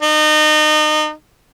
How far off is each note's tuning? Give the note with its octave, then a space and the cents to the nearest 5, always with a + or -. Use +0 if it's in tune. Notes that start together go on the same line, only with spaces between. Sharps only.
D#4 -30